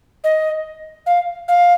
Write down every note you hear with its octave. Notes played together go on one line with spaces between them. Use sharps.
D#5
F5
F5